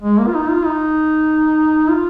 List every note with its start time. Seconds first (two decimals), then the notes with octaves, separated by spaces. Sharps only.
0.03 G#3
0.19 A#3
0.27 F4
0.34 D#4
0.49 F4
0.65 D#4
1.90 F4